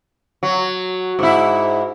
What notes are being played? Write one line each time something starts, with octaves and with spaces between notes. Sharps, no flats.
F#3
G#2 E4